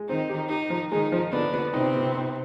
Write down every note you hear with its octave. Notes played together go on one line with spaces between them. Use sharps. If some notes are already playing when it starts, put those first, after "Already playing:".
Already playing: G#3
D#3 C4 D#4
G4
D#3 D#4 G4
F3
D#3 G#3 D#4
F3
D3 B3 D4
B3
C3 C4 D#4
B3
D#4